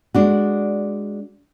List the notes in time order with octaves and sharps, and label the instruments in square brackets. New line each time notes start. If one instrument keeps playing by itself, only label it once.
[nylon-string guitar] G#3 D4 F#4